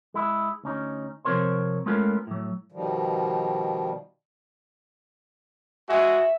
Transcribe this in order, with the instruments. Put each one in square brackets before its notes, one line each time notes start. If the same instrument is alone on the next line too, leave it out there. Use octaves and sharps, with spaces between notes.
[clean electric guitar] G#3 E4
D2 C#4 D#4
C3 F3 C4 A#4 C#5 C6
G#3 A3 B3 C#4 F4 A#4
A2 F#3
[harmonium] B2 D#3 F3 G3
[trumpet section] G#3 F#4 G#5 [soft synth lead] E5